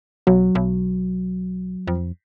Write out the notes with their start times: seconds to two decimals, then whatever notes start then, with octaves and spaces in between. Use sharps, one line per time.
0.27 B1 F#3
0.55 B1
1.87 F2